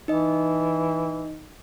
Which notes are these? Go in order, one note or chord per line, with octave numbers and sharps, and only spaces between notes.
E3 D#4 D#5